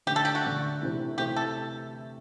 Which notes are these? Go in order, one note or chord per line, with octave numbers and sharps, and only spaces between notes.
D3 A3 D4 G4
A4
G4
F#4
D3 A3 D4
C3 E3 A3
C3 E3 A3 G4
A4